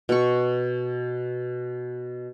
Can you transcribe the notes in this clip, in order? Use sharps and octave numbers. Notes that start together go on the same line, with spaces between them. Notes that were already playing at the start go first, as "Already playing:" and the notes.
B2 C#6